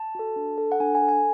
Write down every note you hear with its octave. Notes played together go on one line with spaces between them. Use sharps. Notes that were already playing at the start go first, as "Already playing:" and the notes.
Already playing: A5
F#4 A4
D4
A4
F#5
D4 G#5
G#5
A4
G#5